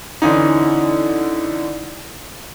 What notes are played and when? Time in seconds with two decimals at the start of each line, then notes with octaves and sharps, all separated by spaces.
0.22 D3 E3 C#4 D#4